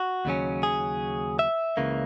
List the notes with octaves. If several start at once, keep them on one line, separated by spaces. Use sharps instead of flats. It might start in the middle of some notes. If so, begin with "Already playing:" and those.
Already playing: F#4
D#2 C#3 F#3 C#4
G#4
E5
C#2 C#3 E3 A#3